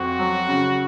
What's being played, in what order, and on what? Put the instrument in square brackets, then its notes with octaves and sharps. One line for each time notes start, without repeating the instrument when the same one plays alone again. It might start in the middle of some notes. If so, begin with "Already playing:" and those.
Already playing: [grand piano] F2 [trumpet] F#4
[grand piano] F#3
C#3